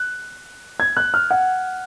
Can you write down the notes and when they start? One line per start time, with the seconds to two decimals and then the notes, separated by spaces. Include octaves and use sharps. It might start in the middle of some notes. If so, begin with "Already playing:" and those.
Already playing: F#6
0.80 G#6
0.97 F#6
1.14 F6
1.31 F#5